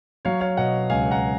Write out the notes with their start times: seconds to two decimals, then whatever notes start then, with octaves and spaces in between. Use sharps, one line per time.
0.25 F#3 C#5 F5
0.41 C#5 F5
0.57 B2 D#5 F#5
0.90 C#2 F5 G#5
1.11 F#5 A#5